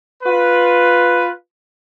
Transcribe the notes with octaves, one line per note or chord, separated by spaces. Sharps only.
F4 B4